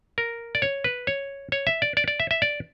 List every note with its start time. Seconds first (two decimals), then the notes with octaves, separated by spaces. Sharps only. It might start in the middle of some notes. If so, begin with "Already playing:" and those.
0.18 A#4
0.55 D5
0.62 C#5
0.84 B4
1.07 C#5
1.52 C#5
1.67 E5
1.82 D5
1.97 D5
2.08 D5
2.20 E5
2.31 E5
2.42 D5